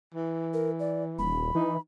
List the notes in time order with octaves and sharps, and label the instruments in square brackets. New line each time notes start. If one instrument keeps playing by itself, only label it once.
[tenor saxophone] E3
[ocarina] A#4
D5
[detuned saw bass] D#1 [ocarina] B5
[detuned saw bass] E3 [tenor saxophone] D#4